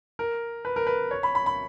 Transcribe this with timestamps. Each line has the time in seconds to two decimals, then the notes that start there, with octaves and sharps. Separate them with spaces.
0.19 A#4
0.65 B4
0.76 A#4
0.87 B4
1.11 C#5
1.23 B5
1.35 B5
1.46 B5